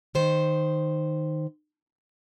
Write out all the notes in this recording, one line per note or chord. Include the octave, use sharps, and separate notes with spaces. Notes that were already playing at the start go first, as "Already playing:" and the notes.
D#3 C5